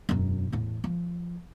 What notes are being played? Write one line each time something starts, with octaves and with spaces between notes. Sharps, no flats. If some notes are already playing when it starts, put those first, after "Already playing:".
E1 F#2
E2 A2
F3